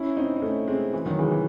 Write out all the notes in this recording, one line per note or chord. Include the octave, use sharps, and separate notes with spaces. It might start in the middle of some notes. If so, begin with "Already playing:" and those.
Already playing: C#4 E4
C4 D#4
D#4
A3 C#4
G#3 C4
E3
D#3 F#3
E3 G#3
E3